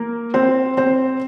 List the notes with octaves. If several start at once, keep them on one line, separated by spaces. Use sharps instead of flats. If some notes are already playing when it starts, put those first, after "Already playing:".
Already playing: A#3 A#4
C4 C5
C4 C5